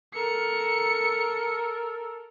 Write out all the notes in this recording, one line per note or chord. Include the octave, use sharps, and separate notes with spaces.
A4 A#4 C#7